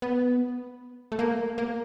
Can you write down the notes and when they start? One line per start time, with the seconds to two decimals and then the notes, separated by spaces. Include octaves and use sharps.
0.02 B3
1.12 A3
1.19 A#3
1.58 A#3